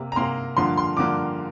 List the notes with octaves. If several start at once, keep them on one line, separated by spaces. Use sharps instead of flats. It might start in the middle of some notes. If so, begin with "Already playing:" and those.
Already playing: C3 A#3
A#5
C3 A#3 C6
G2 D3 F3 A#3 C6
C6
G2 D3 F3 A#3 D6